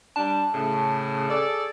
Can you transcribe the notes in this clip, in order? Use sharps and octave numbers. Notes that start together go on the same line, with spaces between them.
G3 D4 A5
A2 C#3
G#4 A4 D5